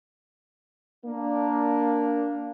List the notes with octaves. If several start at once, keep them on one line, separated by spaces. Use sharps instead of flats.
A#3 D4